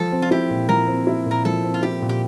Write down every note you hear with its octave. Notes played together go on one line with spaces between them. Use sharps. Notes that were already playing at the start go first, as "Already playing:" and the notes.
Already playing: F3 A4
C4
F4
E4 G4
A#2
F3 A#4
C4
E4
A#2 A#4
F3 A4
C4
F4
E4 G4
A#2
G4